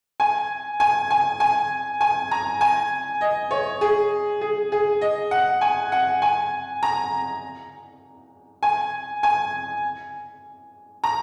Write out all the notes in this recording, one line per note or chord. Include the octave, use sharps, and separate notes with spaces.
G#5
G#5
G#5
G#5
G#5
A#5
G#5
D#5
C#5
G#4
G#4
G#4
D#5
F#5
G#5
F#5
G#5
A#5
G#5
G#5
A#5